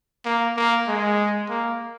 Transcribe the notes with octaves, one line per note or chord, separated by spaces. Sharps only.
A#3
A#3
G#3
A#3